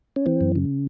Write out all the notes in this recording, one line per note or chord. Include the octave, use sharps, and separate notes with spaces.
C#4
E3 C4
F#2
C#3